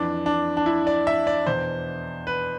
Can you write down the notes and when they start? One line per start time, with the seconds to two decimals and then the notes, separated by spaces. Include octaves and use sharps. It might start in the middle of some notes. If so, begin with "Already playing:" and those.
Already playing: F2 E3 D4
0.26 D4
0.57 D4
0.66 E4
0.87 D5
1.07 E5
1.27 D5
1.46 E2 B2 C5
2.27 B4